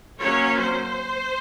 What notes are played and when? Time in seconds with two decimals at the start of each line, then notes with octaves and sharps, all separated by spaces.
0.21 F#3 A#3 C#4 C#5
0.59 C5